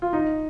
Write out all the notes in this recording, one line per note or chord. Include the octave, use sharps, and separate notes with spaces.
F4
D#4